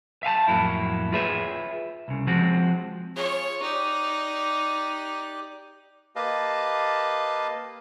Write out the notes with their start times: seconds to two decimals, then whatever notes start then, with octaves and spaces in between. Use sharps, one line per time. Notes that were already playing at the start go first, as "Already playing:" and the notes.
0.23 E5 F5 G#5 A5
0.48 F2 A2 F#3 A#3 E4
1.12 F4 G#4 B4 C#5 E5
2.08 C2 C#3
2.27 F3 G#3 C4 F#4
3.16 F4 G#4 C#5 G#5
3.62 D#4 G4 D5 F#6
6.16 A#3 G4 B4 D#5 F5 A5